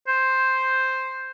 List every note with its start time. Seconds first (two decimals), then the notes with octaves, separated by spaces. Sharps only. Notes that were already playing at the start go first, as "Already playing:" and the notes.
0.08 C5